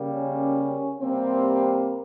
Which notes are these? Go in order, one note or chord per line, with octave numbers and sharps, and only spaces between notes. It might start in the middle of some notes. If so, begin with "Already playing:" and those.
Already playing: C#3 G3 A#3
C#4
C3 G3 A#3 C4